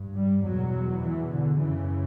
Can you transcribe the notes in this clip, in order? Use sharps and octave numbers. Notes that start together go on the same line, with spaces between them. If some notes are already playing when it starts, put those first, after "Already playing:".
Already playing: G2
G3
E2 B2 F#3
E3
D3
F#2 C#3 E3